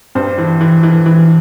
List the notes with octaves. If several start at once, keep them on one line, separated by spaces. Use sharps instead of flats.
G2 C5
E3
E3
E3
E3